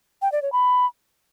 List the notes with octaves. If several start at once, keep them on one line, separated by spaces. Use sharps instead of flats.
G5
D5
C#5
B5